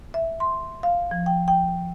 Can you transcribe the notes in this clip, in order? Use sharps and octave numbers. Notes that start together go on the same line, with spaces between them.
E5
C6
F5
F3
G5
G5